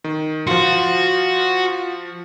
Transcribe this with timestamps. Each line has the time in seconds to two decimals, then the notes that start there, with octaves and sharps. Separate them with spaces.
0.04 D#3
0.47 F3 F#4 F5 C6